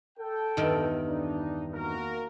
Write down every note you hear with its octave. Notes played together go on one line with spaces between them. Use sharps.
A4 G5
E2 G2 D#3
D4 D#4
A#3 F#4 A#4